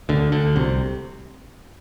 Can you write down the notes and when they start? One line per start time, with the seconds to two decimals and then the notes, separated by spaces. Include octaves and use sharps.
0.09 D2 D3
0.32 D2 D3
0.56 C2 C3